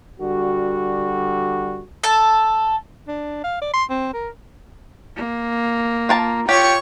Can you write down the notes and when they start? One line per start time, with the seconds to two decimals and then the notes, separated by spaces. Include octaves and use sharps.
0.20 D3 G3 F#4
2.04 A4 A5
3.08 D4
3.44 F5
3.62 D5
3.74 C6
3.90 C4
4.14 A#4
5.16 A#3
6.09 F4 A#4 A5
6.49 F4 G4 C#5 G5 C#6